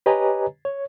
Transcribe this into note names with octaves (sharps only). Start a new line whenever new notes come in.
G4 B4 C#5 D#5 G#5 A#5
C#5